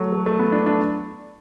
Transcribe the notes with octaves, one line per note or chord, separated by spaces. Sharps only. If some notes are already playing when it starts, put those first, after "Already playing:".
Already playing: F#3 A3
A3
A3
B3
D4
D4